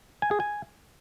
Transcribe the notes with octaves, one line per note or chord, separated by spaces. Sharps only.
G#5
G#4
G#5